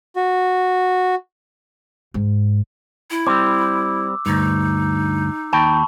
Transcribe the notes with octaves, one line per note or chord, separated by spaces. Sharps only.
F#4
G#2
E4
G3 C4 D6 E6
D2 G2 D#4
D#2 G5 A5 B5 C#6